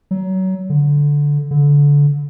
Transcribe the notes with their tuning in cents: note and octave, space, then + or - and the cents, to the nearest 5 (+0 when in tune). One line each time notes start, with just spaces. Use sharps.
F#3 +25
D3 -10
D3 -25